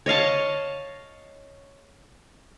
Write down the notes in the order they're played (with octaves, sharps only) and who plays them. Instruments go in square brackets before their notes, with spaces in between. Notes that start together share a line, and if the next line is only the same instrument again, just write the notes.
[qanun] C#5 D#5 F5 A5